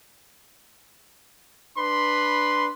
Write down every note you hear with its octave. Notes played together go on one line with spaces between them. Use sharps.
D4 B4 B5 C6